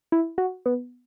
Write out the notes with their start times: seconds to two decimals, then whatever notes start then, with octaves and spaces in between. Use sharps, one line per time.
0.12 E4
0.38 F#4
0.66 B3